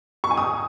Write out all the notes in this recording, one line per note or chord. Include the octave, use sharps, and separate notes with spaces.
C#6
G#5
D#6